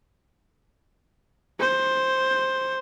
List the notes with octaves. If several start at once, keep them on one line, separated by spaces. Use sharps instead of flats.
C5